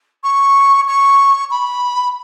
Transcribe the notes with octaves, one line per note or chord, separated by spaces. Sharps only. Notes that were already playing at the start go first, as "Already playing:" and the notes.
C#6
C#6
B5